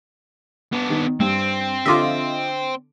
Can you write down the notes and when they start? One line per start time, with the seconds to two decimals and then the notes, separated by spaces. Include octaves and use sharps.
0.72 B3 D4
0.90 D#3
1.20 G2 C4
1.86 D3 F4 A4 D#5 E5 D6